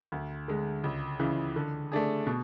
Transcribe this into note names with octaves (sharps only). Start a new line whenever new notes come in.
D2
D3 G#3
C#2
C#3 E3
D3
A3 D4 G#4
B2